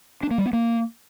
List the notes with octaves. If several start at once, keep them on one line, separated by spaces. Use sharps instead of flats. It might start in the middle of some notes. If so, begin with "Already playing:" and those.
D4
A#3
G3
B3
A#3